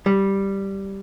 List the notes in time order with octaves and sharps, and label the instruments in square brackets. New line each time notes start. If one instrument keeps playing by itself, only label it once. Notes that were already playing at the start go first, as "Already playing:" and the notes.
[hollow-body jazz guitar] G3